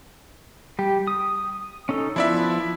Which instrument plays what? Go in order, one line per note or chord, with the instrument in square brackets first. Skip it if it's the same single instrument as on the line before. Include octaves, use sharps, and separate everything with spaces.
[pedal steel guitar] G3 G4
D#6
C#4 D#4 A4
[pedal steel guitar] F3 B3 B4 [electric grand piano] E4 D5 E5